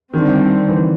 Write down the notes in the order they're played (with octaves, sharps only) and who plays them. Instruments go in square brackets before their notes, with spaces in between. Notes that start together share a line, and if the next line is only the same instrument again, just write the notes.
[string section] D3 G3 C4 [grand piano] D#3
[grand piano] E3